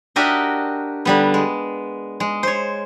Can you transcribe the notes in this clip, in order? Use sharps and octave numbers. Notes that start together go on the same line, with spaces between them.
D4 F#4 G4 A#4 D#5 E5
D3 G3 B3
G#3
G#3
C5 C#5